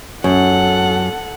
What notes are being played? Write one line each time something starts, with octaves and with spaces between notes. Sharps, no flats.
F#2 A4 F#5